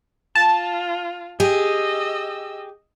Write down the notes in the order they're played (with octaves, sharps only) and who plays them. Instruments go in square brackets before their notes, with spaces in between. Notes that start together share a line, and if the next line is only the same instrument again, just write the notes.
[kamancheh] F4 [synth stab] A5
[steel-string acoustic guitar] G4 G#4 [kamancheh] D#5 E6